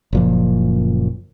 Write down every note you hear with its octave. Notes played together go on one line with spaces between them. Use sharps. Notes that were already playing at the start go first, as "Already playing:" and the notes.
F#1 A#2 F3